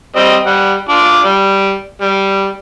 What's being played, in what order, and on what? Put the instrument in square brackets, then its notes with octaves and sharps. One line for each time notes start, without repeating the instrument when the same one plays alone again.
[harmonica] G3 C4 D#5
G3 F#5
D4 F4 D5
G3
G3